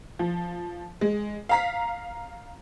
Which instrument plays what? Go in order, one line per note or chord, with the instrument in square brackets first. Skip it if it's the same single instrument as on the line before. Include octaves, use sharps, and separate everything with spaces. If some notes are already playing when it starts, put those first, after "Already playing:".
[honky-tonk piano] F3
G#3
F5 A#5 B6